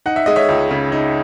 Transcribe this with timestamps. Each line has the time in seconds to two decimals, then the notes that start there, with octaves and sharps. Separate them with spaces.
0.06 D#4 F#5
0.16 E5
0.26 G#3 D#5
0.36 C#5 E5
0.49 C#2
0.71 C#3
0.92 D#4